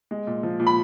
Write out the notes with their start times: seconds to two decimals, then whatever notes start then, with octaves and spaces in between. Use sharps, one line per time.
0.11 G#3
0.27 A#2
0.43 F3
0.60 A#2
0.67 B5